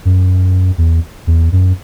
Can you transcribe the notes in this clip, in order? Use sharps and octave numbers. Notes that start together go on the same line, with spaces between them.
F#2
E2
E2
F#2